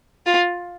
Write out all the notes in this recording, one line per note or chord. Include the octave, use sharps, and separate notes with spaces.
F4